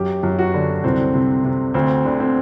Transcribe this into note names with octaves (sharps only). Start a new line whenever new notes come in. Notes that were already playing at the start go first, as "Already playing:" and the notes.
Already playing: F#2 G4
F#2
F#4
D3
C2 C4
C3
C3
D2 C4
D3
C4